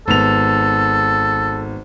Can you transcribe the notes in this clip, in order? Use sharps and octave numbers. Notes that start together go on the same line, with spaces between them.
G#1 B3 A4 F7